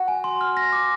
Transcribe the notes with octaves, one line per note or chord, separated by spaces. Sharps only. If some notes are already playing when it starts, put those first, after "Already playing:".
Already playing: F#4
G#5
C6
F6
A#6
D6